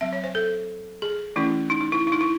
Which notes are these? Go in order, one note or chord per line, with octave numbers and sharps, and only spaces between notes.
F#3 C4 E5
C#5
C5
A4
G#4
E3 A3 C#4 E4
D#4
D#4
E4
E4
D#4
E4